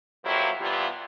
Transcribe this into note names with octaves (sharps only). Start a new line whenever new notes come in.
F2 F3 F#3 A#3 E4 G4
C3 E3 G3 B3 F4